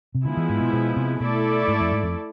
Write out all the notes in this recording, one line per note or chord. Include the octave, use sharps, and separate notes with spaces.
C3
D3 F3 G#3 B3 E4
E3
G#2
B2
B2
C3
B2 A3 E4 A4 D5
G#2
F2
G#2
F2